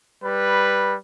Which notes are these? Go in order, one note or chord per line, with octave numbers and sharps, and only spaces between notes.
G3 B4